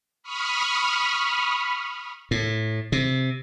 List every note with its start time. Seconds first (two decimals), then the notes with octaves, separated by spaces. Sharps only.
0.23 B5 C#6 D#6 F6
2.31 A2
2.92 C3